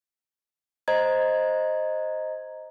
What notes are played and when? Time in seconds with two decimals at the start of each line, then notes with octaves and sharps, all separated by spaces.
0.88 C5 D#5 A#5 G#6